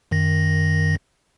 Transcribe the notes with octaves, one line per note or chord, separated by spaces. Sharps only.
F#2 D#3 A#6